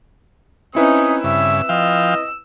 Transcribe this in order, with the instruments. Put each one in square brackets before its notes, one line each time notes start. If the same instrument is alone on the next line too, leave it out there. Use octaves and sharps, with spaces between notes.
[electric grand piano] C4 E4 B4 [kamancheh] C#4 D#4 [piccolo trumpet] D#6
[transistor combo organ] G2 C#3 [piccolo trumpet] E5 [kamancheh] E6
[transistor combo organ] F3 F5 G5 [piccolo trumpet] D#5